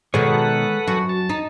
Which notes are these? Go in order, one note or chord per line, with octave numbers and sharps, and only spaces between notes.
B2 D#3 G#3 G#4 A4 B4 C#5 F#5
F#2 F#4
A5
D#4